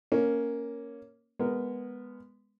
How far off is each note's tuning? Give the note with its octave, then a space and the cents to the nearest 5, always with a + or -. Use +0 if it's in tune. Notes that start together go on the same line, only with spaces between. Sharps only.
A#3 +0 C#4 +0
G#3 -10 B3 +0 A#4 +0